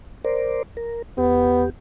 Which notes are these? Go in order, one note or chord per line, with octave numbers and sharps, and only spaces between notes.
A#4 C5 D5
A#4
E2 B3 G4